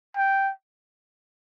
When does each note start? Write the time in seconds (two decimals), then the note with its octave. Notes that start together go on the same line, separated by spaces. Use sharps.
0.16 G5